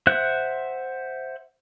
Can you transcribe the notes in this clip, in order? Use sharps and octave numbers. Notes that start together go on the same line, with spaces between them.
C5 E5 F#5 F#6